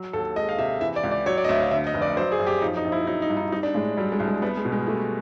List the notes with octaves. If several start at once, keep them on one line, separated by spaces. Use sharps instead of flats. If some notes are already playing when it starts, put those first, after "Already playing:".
Already playing: F#3
D#2 A4
G#3 D#5
F5
C3 E5
E3 E5
D5
C#2
D5
F#3 C#5
D5
D#5
D2 E5
F5
D3 E5
D#5
F1
D5
F#3 C5
G#4
F#2
G4
F3 D#4
D#4
A#1
E4
F#3 D#4
D#4
G2
D#4
G3 D#4
D4
A2 G#3
F#3 G3
G#3
C2
G#3
G3 B3
G#3
B2
G#3
G3 A3